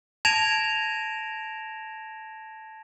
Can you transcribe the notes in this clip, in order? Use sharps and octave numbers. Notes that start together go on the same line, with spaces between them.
A5 G#6 A#6 D7 E7 F7